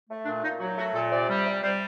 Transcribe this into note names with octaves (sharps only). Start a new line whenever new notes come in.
A3
A#2 D4
A#2 D#4
F#3 F#4
A3 F#4
A#2 A4
C3 D5
G3
C3
G3 C5